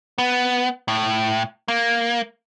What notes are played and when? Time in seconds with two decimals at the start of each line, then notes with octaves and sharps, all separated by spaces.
0.18 B3
0.88 A2
1.68 A#3